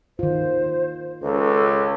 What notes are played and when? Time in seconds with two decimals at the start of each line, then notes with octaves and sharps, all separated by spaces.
0.19 D#3 F4 C5
1.22 C#2 A4